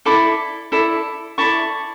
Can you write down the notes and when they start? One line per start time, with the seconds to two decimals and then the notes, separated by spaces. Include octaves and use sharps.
0.05 E4 A4 D5 B5 D6
0.72 E4 A4 D5
1.38 E4 A4 D5 A5 C#6